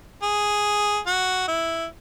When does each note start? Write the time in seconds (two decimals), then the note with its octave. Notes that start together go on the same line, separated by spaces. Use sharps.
0.23 G#4
1.07 F#4
1.48 E4